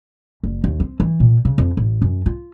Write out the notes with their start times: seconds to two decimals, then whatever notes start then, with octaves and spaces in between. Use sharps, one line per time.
0.43 F#1
0.64 D#2
0.80 C4
1.00 E3
1.20 A#2
1.45 C#3
1.58 F2
1.77 A1
2.02 F#2
2.26 F4